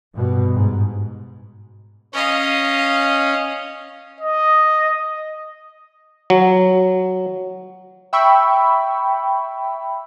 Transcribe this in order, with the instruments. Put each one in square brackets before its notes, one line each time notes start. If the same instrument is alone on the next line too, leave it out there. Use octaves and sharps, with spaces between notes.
[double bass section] G2 B2
G#2
[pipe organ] C#4 [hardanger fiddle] D#5 F5
[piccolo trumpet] D#5
[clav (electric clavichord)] F#3
[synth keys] E5 G5 B5 C#6 E6